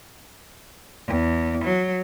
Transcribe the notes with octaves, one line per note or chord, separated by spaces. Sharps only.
E2
F#3